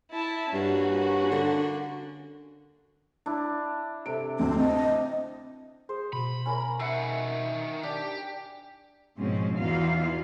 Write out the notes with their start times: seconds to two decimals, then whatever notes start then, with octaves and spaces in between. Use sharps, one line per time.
0.13 E4 A5
0.54 G2 A#3 C#4 F#4
1.32 D3
3.26 D4 E4
4.06 C3 A4 D7
4.40 D2 C4
4.59 C4 D#5 A5
5.89 G#4 C5
6.13 B2 B5
6.46 C#4 A#4 A#5
6.80 D#3 E5 F#5
7.83 D4 G4
9.17 G#2 B2 F3 G#3 C4 C#4
9.58 E2 E3 D#4 F4 F#4 F5